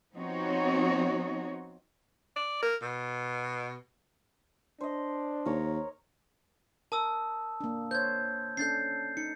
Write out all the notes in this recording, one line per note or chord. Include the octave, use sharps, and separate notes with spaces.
F3 B3 C4 D#4 F#4 C#5
D5
A#4
B2
D4 C5 D#5
D#2 A#4 C#5
A#4 A5 D#6 E6
A#3 D4
C5 C#5 G6 G#6
C#4 D4 A4 G6 A6 C7
D#4 C#7